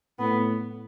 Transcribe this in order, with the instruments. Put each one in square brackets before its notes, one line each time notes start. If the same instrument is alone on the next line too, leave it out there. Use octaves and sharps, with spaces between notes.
[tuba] A2 [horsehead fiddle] B3